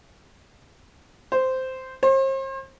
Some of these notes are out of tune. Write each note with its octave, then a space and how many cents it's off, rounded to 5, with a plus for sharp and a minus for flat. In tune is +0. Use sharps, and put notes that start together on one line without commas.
C5 -10
C5 +40